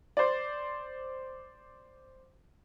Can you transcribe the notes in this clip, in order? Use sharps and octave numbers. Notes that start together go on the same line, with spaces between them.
C5 D5